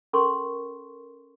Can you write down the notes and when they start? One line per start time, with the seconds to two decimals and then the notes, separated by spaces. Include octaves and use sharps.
0.13 C#4 A4 A#4 C6 C#6